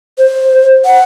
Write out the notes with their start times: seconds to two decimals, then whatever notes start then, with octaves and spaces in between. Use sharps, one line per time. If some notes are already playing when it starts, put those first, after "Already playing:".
0.18 C5
0.85 F#5